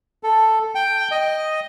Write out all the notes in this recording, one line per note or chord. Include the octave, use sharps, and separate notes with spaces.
A4
G5
D#5